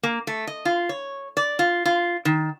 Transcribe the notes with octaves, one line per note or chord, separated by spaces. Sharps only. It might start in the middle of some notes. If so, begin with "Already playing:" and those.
A#3
A3
D#5
F4
C#5
D5
F4
F4
D#3